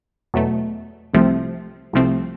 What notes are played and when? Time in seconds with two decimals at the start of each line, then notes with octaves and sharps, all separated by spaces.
0.34 E2 B2 F#3 A3
1.14 C2 C3 F3 A3 C4
1.93 C2 C3 F3 A3 C4